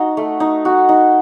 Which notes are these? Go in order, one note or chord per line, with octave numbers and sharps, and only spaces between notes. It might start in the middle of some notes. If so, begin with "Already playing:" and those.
Already playing: D#4 F#4
A3
D#4
F#4
D#4